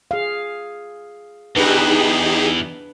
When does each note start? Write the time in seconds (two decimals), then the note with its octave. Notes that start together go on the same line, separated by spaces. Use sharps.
0.11 G#4 F5
1.57 E2 D4 D#4 G4 G#4 B4